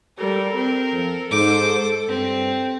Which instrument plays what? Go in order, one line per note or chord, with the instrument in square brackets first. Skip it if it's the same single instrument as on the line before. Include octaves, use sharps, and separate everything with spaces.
[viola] G3 A4 [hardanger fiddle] A#4
[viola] C4
[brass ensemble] F2 [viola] A4
[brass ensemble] G#2 [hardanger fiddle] C5 D6
[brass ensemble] G2 [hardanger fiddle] C4